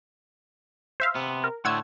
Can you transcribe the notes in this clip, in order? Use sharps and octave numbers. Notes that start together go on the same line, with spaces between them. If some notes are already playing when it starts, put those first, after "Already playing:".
C5 E5 F5
C3 B3
A#4
A2 D3 A3 F#5 E6 G#6